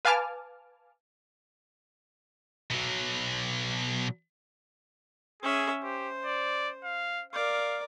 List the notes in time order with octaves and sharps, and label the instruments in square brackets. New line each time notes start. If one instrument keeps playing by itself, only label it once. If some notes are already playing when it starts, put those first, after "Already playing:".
[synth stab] B4 F5 G#5 A5 D6 F6
[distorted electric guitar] B2 F#3
[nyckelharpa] C#4 E5 [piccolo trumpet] G#4
[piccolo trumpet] G4 [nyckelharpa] C5
[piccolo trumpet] D5
F5
[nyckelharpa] A#4 D5 [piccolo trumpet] F5